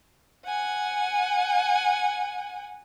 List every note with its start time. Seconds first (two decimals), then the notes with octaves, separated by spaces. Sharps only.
0.45 F#5 G#5